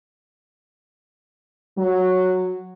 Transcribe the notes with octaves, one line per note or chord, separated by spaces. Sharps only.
F#3